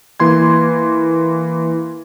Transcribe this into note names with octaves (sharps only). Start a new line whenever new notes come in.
E3 A#3 C6 G#6